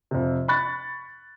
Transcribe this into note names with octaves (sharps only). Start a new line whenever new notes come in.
F2 C3
B5 C#6 F#6 A6